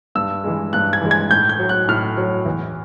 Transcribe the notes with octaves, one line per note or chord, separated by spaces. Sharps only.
G2 E6
E3 G#3
G2 F#6
G#6
E3 G#3
G#6
A2 G6
G6
F#3
F#6
A2 F6
F#3
E2